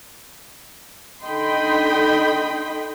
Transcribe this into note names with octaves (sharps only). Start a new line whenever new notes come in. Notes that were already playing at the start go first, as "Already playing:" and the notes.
D3 D#4 D#5 G5 B5 C6